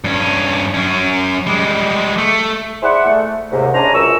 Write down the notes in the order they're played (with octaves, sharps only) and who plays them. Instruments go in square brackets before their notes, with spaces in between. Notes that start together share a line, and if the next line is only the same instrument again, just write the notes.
[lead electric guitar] G2 C#4
F#2 C#4
G3 G#3
A3
[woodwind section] E4 G#4 C5 D5 E5 F#5
A3
D#2 G#2 C3
C#4 D4 E4 C5 G#5 A#5
C#2 F#2 G#4 C#6 E6